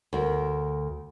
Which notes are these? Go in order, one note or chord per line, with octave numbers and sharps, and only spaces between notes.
D2 A#4